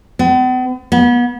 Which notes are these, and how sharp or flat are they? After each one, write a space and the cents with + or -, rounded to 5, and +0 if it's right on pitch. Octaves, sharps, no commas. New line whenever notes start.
B3 +45
B3 -35